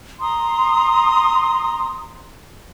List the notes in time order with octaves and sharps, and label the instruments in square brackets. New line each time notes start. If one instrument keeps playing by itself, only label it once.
[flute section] A#5 C6 D#6